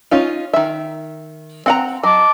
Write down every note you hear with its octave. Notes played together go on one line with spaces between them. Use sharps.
C#4 D#4 F4
D#3 E5
C4 F#5 A#5
F#3 D#5 A5 D6